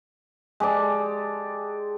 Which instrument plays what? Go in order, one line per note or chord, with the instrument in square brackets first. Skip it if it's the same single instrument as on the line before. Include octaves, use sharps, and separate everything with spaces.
[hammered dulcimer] G#3 G4 A4 D5